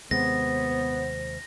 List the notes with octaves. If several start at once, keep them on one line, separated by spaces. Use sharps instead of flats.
D#2 C3 G#3 B3 C5 A#6